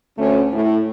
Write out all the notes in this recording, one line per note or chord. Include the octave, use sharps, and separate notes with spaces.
D2 A3 C#4
A2